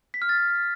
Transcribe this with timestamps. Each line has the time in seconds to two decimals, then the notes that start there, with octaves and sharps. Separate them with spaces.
0.14 B6
0.22 F6
0.29 A6